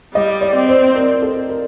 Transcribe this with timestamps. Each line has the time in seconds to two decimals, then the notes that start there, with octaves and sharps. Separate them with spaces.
0.14 G3 D#5
0.41 D5
0.56 C4
0.69 C5
0.96 A#4
1.22 A4
1.49 A#4